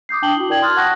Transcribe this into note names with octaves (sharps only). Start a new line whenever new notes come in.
D6 D#6 G6 C7
D4 G5 A5 F#7 G7
E4 F#4
E4 A#4 D5 G5 G#6 F#7
A5 C6 D#6 F6 F#6 A6
F#5 A5 C#6 F#6 A#6